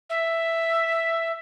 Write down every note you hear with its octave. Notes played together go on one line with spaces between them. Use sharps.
E5